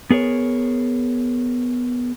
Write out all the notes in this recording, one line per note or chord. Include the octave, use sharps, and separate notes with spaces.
B3 G#4 A#4 C#5